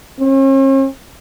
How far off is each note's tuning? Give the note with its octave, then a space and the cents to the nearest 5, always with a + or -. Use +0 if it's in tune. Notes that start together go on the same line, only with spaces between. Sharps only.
C#4 -45